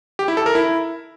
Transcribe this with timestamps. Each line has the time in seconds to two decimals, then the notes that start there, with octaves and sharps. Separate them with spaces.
0.19 G4
0.28 E4
0.37 A4
0.46 A#4
0.55 E4